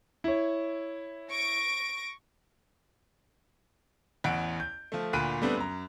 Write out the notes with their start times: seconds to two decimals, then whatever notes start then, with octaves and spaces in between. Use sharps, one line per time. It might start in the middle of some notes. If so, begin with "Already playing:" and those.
0.24 E4 C#5
1.30 C#6 A#6 D7
4.24 A1 E2 F#5 D7
4.60 G6
4.92 F3 A3
5.13 D2 A#2 B5 F#6 D7 D#7
5.42 G3 A3 B3 C4 D4
5.57 F#2 A#5